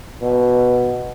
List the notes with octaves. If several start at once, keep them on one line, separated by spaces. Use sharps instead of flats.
B2